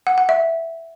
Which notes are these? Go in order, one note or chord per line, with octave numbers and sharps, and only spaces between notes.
F#5
F#5
E5